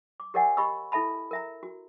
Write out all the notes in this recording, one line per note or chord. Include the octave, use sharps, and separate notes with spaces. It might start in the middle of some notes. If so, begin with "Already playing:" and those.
D6
G4 A#4 C#5 D#5 F#5 G#5
G4 D#5 B5 C#6 E6
E4 A4 E5 A5 B5
A#4 E5 A#5
F#4